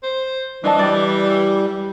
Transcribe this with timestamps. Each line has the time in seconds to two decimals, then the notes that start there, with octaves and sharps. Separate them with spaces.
0.03 C5
0.64 E3 D4 D#5 A5
0.79 G3 D5